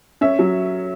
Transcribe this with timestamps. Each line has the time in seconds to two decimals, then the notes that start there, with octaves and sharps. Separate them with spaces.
0.21 C#4 E5
0.39 F#3